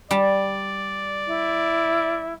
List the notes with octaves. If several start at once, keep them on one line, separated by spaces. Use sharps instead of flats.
G3 D5 A5
E4